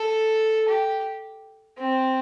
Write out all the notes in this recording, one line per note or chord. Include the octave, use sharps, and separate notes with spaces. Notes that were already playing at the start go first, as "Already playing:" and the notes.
Already playing: A4
G4
C4